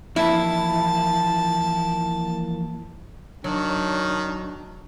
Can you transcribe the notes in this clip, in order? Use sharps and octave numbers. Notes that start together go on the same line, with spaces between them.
E3 F3 A#3 E4 A5
D#3 F#3 D4